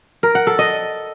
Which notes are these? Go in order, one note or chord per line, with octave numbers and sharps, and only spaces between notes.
A#4
F#5
A4
D#5